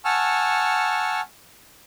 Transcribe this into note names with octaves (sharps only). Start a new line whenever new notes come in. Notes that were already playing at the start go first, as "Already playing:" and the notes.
F#5 G#5 A5 C#6 E6 F6